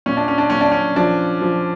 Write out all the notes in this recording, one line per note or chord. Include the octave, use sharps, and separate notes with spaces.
A#2 C#4
D4
C#4
D4
A#2 C#4
D4
C#4
F3 D4
F3